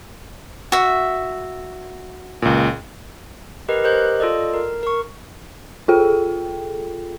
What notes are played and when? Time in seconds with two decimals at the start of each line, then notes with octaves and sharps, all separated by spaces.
0.72 F#4 E5
2.42 C#2 A#2
3.69 G4 A#4 B4 D#5
3.84 G4 A#4 C5 D#5 F#6 G6
4.20 F4 A4 D5 D#5
4.54 A#4
4.83 A#4 C#6
5.88 F4 G#4 A4 G5